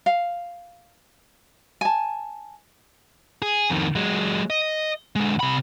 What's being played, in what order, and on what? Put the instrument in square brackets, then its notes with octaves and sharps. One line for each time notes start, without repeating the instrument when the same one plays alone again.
[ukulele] F5
G#5 A5
[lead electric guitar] G#4
F2 D#3
F#3 G#3
D#5
D3 G#3
C3 B5